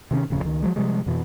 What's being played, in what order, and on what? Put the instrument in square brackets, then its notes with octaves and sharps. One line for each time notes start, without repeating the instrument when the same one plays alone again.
[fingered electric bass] C3 D#3 C4 C#4
D1 F2 C#3
C#2 D#3
F3 F#3 G#3
C3 F3 G3 G#3
F2 B2 E3